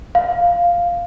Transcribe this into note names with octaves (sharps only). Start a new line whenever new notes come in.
F5